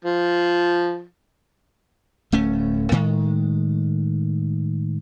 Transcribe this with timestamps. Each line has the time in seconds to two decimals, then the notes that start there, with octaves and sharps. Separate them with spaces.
0.05 F3
2.32 D1 A3 C#4
2.92 A2 D#3 G#3